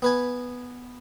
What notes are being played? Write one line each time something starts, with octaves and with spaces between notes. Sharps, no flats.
B3 B4 G#5